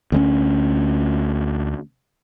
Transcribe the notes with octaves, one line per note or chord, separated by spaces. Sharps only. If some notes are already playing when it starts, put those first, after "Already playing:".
D2 G#3 C#4